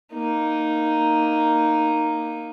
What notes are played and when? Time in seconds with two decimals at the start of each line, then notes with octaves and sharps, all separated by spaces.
0.14 A#3 D#4